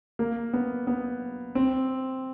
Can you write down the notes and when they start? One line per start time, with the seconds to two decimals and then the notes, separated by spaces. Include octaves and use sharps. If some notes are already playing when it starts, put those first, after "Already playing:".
0.19 A#3
0.53 B3
0.87 B3
1.55 C4